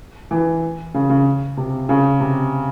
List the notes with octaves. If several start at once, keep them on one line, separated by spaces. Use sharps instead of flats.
E3
C#3
C#3
C3
C#3
C3